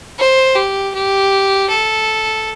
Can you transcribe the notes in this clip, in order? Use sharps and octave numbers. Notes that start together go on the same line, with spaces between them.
C5
G4
G4
A4